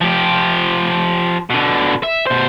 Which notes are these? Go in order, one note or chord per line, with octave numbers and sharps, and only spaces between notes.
F3 G4
B2 D3
E5
B2 C5